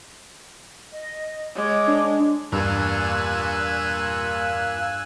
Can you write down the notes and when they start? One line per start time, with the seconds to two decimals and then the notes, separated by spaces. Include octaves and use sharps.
0.92 D#5
1.55 G#3 C#5 D6
1.87 D4
2.53 E2 G2 F4 A#4 G#5 E6 F#6